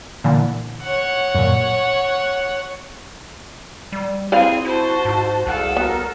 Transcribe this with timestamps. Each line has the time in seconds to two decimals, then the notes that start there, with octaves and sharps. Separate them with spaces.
0.24 A#2 D3 E3
0.82 C#5 F#5
1.35 F#2 A#2
3.92 G3
4.32 C4 E4 G#4 B4 D5 F5
4.65 E4 F#4 C5 A5
5.05 G#2
5.47 C2 G#4 A4 F5 F#5
5.77 B3 F#4 A#4